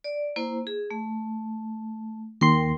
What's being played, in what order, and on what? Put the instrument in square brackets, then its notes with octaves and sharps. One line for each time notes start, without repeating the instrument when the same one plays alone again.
[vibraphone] D5
A#3 E4 C5
G#4
A3
[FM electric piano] D#2 C6 [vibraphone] A#4 G5